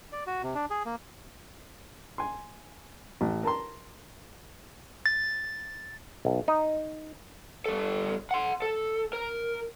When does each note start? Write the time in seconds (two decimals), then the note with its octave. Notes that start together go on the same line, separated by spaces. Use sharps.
0.12 D5
0.27 F#4
0.43 C3
0.55 D4
0.70 G#4
0.86 A#3
2.18 G#5 C6
3.21 A1
3.43 A#4 A5 A#5 C6
5.06 A6
6.25 B1
6.48 D#4
7.66 G3 A4
8.31 F#5 C6
8.62 A4
9.13 A#4